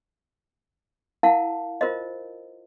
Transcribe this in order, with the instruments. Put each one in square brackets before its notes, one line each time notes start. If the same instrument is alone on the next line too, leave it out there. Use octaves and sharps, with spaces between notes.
[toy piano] E4 A#4 F5 F#5 A5
F4 A#4 C5 D#5